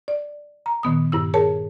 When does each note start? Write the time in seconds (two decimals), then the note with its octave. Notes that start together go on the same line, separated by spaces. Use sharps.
0.08 D5
0.66 A#5
0.83 A#2 D#3 B3 D#6
1.12 G2 E4 E6
1.34 G#4 A#4 C#5 A5